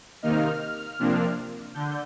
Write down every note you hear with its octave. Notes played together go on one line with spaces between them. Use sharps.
C3 D#3 A#3 D#4 F6
C3 F3 A#3 D4
D3 G6